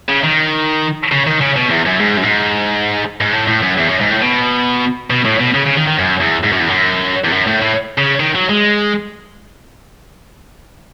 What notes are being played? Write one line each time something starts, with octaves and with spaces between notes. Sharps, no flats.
C#3
D#3
C#3
D#3
C#3
B2
E2
F#2
G#2
F#2
G#2
G#2
A2
A2
F#2
E2
F#2
G#2
A2
B2
B2
A2
B2
C#3
C#3
D#3
D#3
F#2
E2
G#2
F#2
E2
F#2
E2
F#2
A2
A2
C#3
D#3
F#3
G#3